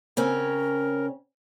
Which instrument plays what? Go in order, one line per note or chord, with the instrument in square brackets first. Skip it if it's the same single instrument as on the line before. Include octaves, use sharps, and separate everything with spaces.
[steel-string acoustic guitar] C#3 C4 C#4 [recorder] A#4